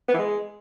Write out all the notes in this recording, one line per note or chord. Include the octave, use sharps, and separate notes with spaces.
B3
E3
G#3